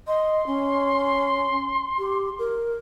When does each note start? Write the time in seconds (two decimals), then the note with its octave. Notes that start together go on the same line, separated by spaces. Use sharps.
0.07 D#5 C6
0.47 C#4
1.99 G4
2.39 A#4